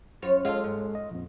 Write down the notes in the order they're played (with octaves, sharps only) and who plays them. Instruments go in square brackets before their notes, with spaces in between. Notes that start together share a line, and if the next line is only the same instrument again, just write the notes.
[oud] F#2 F4 C#5
[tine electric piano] G#3 A4 [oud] F4 F5
[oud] G#2
[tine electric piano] D#5
A#1 F2